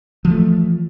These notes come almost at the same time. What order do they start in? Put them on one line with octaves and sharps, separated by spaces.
F3 E3 A3